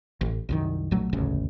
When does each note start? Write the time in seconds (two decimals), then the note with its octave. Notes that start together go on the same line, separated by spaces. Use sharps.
0.21 A1
0.49 C2 F#2 D#3
0.91 B1 A#2 F#3 A3
1.13 E1 A1 D2 C#3